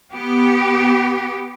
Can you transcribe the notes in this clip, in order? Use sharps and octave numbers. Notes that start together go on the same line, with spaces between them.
B3 G4